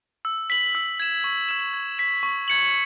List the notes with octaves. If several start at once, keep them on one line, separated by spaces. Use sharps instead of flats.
E6
B6 F#7
E6
G#6 E7
C#6
E6 G#6 E7
G#6
B6 E7
C#6
G#6 C#7 F#7